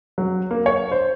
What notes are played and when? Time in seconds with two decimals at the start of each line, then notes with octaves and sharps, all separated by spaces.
0.18 F#3
0.51 A#3
0.66 C#5
0.92 C5